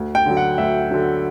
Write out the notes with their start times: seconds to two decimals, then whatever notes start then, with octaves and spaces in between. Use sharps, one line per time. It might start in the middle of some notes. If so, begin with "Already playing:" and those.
Already playing: D2
0.15 G5
0.26 D3 F#3
0.37 F#5
0.58 D2 E5
0.91 D3 F#3